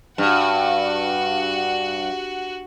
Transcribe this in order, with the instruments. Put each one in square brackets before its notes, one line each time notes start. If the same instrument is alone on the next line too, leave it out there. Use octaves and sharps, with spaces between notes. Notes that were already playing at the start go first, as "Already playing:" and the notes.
[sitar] G2 [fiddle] F#4 F#5